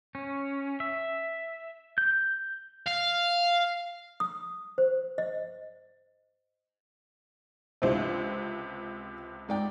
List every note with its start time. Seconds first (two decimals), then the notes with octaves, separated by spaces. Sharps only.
0.15 C#4
0.80 E5
1.98 G6
2.86 F5
4.20 D#6
4.78 C5
5.18 D#5
7.82 C#2 C3 D4 E4 C5
9.49 G#2 D5 G5